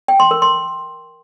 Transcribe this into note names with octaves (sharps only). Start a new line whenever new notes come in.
G5
C6
A#4
C6